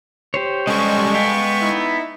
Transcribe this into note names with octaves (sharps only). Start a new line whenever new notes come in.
G4 C5 C#5
C#3 G3 G#3 A4 D#5 G#5 C#6
B3 F5 G5
D#4 E4